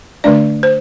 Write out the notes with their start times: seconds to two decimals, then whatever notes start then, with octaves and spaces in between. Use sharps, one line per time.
0.24 D3 A3 D4 D5
0.63 C5